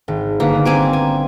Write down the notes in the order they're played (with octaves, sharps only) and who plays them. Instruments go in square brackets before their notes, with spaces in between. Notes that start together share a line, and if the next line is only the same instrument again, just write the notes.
[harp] G#1
[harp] G1 B4 [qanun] A#3
[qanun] C4 G#5 D6
G#5